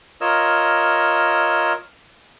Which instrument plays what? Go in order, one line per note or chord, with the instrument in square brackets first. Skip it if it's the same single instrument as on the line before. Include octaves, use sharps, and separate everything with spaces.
[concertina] F4 A#4 C#5 D#5 E6